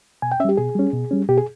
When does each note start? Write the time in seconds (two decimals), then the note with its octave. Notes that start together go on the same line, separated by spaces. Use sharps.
0.22 B2 G#5
0.32 G5
0.40 C#4 E5
0.45 G3 G4
0.57 B2 G#4
0.75 G3 C#4
0.93 B2
1.11 G3 C#4
1.29 B2 G4
1.37 G#4